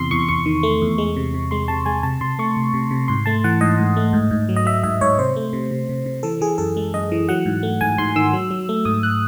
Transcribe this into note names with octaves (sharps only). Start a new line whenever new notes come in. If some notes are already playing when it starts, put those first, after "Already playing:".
Already playing: E2 C3 C6
E2 C#6
E2 C#6
D#3
A3
E2
G#3
C3
C3
G#3 C6
C3 A5
G#3 G#5
C3 A5
C3 C6
A3 C#6
C3
C3
C3
G#2 C6
A3 A5
E3 F#5
G#2 D#5
G#2
A3
G#2
G#2
F#3
D#5
F#3 E5
G#2 E5
G#2 C#5
C3 C5
A3
C3
C3
C3
C3
E3 A4
E3 G#4
F#2 A4
G#3
F#2 D#5
E3
F#3 F#5
G#2
A3
G#2 G#5
G#2 C6
D#3 E6
F#3
F#3
A3
G#2 D#6
F#6